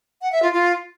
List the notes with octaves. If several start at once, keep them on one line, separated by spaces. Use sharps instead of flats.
F#5
E5
F4
F4